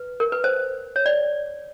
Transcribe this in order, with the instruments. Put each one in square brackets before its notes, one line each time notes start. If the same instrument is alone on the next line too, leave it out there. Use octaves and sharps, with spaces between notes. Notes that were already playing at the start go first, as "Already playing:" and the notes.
Already playing: [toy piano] B4
A#4
B4
C5
C#5
D5